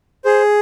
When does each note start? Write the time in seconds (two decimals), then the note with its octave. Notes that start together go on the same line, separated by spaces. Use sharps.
0.25 G#4 C5